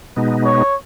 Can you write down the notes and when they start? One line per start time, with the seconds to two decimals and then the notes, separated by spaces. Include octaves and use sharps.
0.16 B2 G#3 B3 D#4
0.45 C#5